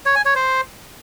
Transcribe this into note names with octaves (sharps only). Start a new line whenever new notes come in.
C#5
G#5
C#5
C5